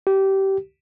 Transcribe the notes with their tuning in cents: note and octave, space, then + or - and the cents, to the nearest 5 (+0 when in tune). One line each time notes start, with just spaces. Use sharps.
G4 -20